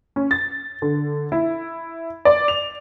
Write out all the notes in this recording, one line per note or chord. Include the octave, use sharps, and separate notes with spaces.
C#4
A6
D3
E4
D5
F7